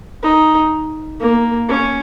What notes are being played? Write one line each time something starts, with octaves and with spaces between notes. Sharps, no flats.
D#4
A#3
C#4